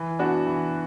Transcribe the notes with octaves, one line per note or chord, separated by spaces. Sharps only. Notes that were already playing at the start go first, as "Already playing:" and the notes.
Already playing: E3
B3 D4 F#4
E3